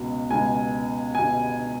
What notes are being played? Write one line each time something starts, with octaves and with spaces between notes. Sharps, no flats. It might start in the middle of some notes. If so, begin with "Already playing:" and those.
Already playing: C#2 B2
C#2 B2 G#5
B2 G#5